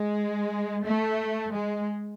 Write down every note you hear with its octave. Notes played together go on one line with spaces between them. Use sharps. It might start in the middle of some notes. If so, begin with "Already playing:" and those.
Already playing: G#3
A3
G#3